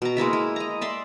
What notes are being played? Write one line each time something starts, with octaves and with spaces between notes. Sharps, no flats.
B2 A#5
G#3 A#3 E4 E5
E4
D#5 A#5
D5 E5 C6